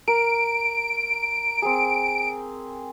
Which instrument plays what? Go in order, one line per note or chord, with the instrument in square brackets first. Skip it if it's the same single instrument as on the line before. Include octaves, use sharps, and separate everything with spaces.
[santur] A#4 [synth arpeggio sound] D7
[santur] C4 G#4